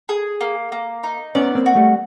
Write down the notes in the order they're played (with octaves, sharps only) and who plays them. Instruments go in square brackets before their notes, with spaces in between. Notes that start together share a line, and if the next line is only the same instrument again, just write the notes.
[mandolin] G#4
A#3
A#3
D#4
[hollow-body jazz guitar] B3 C#4 [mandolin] D5
[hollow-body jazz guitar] A#3 C4
[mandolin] F#4
[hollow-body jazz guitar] G3 A3